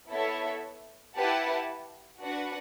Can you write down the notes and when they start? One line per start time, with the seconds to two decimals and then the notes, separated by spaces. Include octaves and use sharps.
0.11 B3 E4 A4 C#5 E5
1.15 E4 G4 B4 F#5 A5
2.20 D4 F#4 B4 F#5